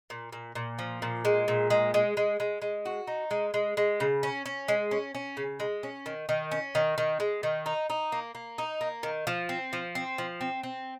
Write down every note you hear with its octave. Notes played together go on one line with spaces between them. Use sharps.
A#2
A#2
A#2
F3
A#2
G#3
A#2
G#3
G#3
G#3
G#3
G#3
F#4
D#4
G#3
G#3
G#3
C#3
C#4
C#4
G#3
C#4
C#4
C#3
G#3
C#4
D#3
D#3
C#4
D#3
D#3
G#3
D#3
D#4
D#4
A#3
A#3
D#4
A#3
D#3
F3
C4
F3
C4
F3
C4
C4